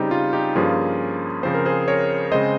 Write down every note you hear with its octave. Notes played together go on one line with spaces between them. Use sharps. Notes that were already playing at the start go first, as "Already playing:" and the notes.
Already playing: C#3 G3 C4 D#4 G4
F4
D#4 G4
G2 F3 A#3 C#4 F4 G#4
C#3 F3 C4 C5
A#4
G#4 C5
A#4 C#5
C#3 G#3 C4 C5 D#5